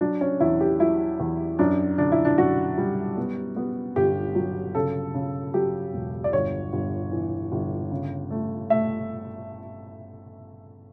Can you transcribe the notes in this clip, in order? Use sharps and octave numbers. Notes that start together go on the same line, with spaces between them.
F#3 D4
C#4
E2 E4
G4
F#3 E4
E2
F#2 D4
D3 D4
E4
D4
F#2 F#4
G3
B3
B3
G1 G4
F#3
C#3 A4
C#3
F#3 G4
E1
D5
G1 C#5
G1
E3
G1
C#3
A3
A3 E5